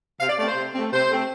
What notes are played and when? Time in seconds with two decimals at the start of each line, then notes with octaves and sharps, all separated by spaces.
0.19 C3 F5
0.28 D5
0.38 A3 C4 D5
0.47 C5
0.55 C3
0.74 A3 C4
0.92 C3 C5
1.10 A3 C4